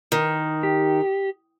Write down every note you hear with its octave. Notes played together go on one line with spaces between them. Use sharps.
D#3
G4